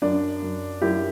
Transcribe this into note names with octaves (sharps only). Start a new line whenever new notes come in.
F#2 D4
F#2
F#2 E4 G4